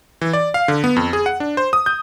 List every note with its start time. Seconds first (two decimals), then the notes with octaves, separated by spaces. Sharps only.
0.21 E3
0.33 D5
0.54 F5
0.68 D3
0.84 B3
0.96 F2
1.13 G#4
1.26 F#5
1.40 D4
1.57 C5
1.73 D#6
1.86 G6